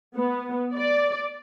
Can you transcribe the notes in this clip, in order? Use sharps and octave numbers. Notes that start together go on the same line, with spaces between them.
B3
D5